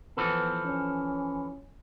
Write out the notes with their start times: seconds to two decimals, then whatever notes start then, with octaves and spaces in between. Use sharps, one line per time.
0.17 E3 F3 B3 A4
0.66 C#4